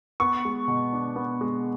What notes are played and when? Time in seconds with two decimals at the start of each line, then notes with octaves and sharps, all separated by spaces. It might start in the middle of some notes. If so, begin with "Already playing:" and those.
0.20 B3 C#6
0.45 G#3
0.68 B2
0.93 D4
1.16 B3
1.41 G#3